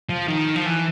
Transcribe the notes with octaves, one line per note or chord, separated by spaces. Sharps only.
F3
D#3
F3
E3